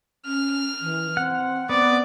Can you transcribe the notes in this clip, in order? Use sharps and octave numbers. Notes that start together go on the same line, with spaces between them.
C#4 F6
E3
C4 F#5
B3 D5